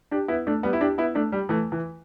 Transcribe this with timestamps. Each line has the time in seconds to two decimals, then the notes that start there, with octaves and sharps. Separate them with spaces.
0.11 D4 G4
0.28 B3 E4
0.47 A3 D4
0.63 G3 B3
0.73 E4
0.81 D4 G4
0.98 B3 E4
1.15 A3 D4
1.32 G3
1.49 E3 A3
1.72 E3